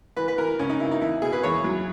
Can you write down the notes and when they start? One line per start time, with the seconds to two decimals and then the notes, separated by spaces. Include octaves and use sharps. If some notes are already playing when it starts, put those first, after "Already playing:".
0.16 E3 B4
0.28 B4
0.38 E3 A#4
0.59 C#2 C#4
0.70 D#4
0.80 C#3 E4
0.91 D#4
1.01 E2 E4
1.22 B2 G#4
1.32 B4
1.43 E2 C#5
1.64 F#3